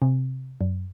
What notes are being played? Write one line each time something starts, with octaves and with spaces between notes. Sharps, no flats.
C3
F#2